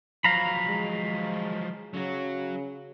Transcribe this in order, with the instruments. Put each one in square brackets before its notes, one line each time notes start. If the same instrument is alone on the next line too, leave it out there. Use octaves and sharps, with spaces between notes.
[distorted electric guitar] F3 F#3 [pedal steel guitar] F5 A#5 B5
[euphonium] G#3
[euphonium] C#3 [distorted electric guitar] F#3 F#4